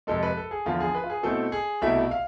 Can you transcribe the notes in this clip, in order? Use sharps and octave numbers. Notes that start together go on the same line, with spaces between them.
F2 C3 G#3 A4
B4
A4
G#4
E2 D3 F3 F4
G#4
B4
F4
G#4
B2 A3 C4 E4 A4
G#4
C2 B2 A3 E4 E5
F5